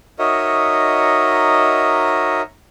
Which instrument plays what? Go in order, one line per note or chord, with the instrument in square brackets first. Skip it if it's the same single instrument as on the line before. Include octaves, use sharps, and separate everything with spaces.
[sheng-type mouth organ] D#4 F#4 A#4 C#5 D#5 E5